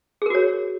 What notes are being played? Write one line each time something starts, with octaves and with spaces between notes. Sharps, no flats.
F#4 G#4 A#4 C#5